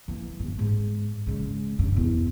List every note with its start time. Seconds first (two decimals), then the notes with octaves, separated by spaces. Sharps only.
0.08 E3 A#3
0.39 G1 G2
0.58 G#2
1.27 C#3 G#3
1.79 G2 C#3
1.94 E2 C3